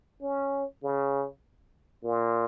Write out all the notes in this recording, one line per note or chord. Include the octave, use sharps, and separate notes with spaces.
C#4
C#3
A#2